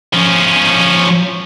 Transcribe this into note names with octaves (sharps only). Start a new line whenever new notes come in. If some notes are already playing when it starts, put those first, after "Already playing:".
F3 C#4